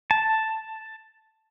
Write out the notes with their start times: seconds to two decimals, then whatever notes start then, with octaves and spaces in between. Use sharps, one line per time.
0.11 A5